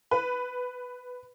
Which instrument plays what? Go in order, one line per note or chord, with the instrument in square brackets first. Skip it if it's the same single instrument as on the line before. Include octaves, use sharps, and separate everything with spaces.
[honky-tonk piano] B4